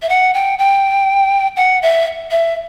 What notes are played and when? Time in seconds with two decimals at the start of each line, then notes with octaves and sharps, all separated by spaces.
0.02 E5
0.09 F#5
0.34 G5
0.59 G5
1.57 F#5
1.82 E5
2.31 E5